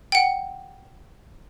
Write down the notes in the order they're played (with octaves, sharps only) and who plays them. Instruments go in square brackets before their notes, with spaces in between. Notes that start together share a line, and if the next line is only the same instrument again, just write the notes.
[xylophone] F#5 G5